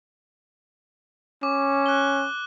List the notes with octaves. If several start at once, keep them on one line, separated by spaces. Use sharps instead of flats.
C#4 D6
F#6 G7